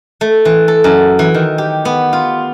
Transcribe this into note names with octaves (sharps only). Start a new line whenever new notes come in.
A3
E3
A4
F#2
E3
D#3
G4
B3
F4